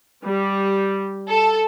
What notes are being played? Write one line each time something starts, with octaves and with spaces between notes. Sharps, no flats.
G3
A4